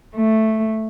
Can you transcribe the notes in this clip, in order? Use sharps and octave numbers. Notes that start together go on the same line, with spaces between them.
A3